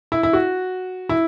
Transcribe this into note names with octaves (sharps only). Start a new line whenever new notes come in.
E4
E4
F#4
E4